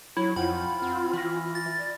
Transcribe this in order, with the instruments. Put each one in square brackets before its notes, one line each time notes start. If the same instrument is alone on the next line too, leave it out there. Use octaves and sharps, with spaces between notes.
[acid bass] F#3 [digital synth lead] E4 [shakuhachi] C#5
[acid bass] F2 [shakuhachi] F4 [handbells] C5 F#5 G5 [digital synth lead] B5
[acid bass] C4 [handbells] F#5
[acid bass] E3 [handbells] B5 F6 A#6
[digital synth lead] A6
[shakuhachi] D5